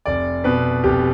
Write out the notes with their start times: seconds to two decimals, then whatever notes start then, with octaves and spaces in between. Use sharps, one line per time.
0.06 F1 D5
0.44 B2 B4
0.84 F1 G4